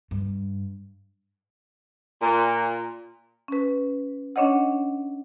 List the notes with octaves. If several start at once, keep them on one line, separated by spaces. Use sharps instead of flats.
G2
A#2
C#4 B4
C#4 D4 C#5 D#5 F#5